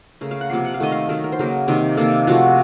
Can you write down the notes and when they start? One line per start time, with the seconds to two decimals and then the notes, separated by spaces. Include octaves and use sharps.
0.21 C#3 A3 A#4
0.31 F5
0.41 F#5
0.50 C3 F3 A#3 F5
0.64 F#5
0.74 F5
0.80 D#3 A3 D#5
0.92 F5
1.09 D#3 F#3 A3 A#4
1.24 A#4
1.32 C5
1.39 C#3 F#3 A#3 A#4
1.68 C3 D#3 A#3
1.97 C3 D#3 A#3 A4
2.27 C3 F3 A3 F#4